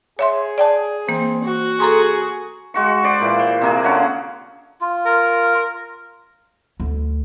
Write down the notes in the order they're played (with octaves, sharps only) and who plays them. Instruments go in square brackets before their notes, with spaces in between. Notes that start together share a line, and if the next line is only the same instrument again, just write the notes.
[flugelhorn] G#4 [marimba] C#5 E5 C6
[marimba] D5 G5 A5
[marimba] E3 A#3 [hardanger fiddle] C4
[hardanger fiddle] F#4
[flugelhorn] G#4 [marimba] A4 A#5 C6
[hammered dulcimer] G#3 F#4 C#6
C5 D5 C6 D6
A#2 E3
C5
C3 A#3 G#4
D3 C#4 F5 F#5
[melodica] F4
[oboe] A#4
[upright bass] D2